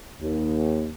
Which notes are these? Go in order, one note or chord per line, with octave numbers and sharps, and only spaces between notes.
D#2